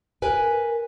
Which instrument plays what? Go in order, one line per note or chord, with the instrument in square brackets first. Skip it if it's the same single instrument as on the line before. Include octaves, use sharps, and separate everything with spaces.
[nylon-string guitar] A#4 B4 G#5